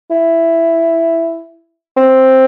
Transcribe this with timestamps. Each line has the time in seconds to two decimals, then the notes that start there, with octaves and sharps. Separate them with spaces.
0.11 E4
1.97 C4